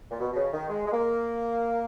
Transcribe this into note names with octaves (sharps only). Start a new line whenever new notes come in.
A#2
B2
B2
C#3
D#3
G#3
G#3
A#3